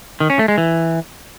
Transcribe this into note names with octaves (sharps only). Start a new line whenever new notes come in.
D#3
C#4
A3
G#3
E3